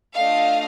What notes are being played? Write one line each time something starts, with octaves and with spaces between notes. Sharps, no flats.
A3 D4 F4 D#5 F5